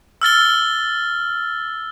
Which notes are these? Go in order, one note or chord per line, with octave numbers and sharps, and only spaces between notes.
E6 F6 A6 G7